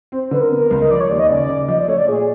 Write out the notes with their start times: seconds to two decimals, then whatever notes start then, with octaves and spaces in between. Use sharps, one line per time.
0.12 C4 C5
0.31 D3 B4
0.41 A#4
0.51 B3 A#4
0.71 C#2
0.82 D#5
0.91 F3 D5
1.00 C#5
1.10 D#2 D5
1.19 D#5
1.30 C#3 D5
1.49 C#3
1.68 F3 D#5
1.79 D5
1.88 A3 C#5
1.99 D5
2.08 A#2 G#4